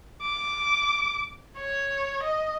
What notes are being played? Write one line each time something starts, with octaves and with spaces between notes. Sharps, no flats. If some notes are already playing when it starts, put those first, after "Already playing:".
D6
C#5
D#5